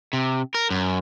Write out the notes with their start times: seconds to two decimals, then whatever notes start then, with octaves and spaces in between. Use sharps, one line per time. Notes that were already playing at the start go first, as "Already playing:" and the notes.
0.13 C3
0.54 A#4
0.71 F#2